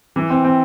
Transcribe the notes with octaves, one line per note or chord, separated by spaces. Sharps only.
E3
C4
C4